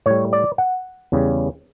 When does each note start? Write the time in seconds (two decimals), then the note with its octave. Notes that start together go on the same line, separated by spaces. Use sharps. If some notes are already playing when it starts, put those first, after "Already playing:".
0.06 A2 G3 C#5
0.33 D5
0.58 F#5
1.12 E2 C#3 G3